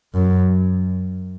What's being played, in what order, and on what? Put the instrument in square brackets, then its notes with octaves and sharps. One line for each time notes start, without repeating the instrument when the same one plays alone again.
[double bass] F#2